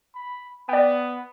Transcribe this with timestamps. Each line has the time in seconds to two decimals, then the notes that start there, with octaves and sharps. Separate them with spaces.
0.15 B5
0.69 B3 D5 G5